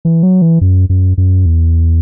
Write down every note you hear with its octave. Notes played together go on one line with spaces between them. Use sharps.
E3
F#3
E3
F#2
F#2
F#2
E2